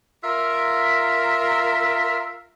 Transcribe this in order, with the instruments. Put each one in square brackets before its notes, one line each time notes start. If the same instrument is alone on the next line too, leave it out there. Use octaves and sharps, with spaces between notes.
[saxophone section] F4 A#4 E5